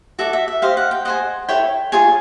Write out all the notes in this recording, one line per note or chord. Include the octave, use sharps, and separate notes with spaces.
F#4 A4 D5 E5
E5
E5
G4 C5 D#5 F5
F#5
G5
G#4 C5 D#5 F#5
E4 A4 C#5 G5
F4 G#4 C#5 G#5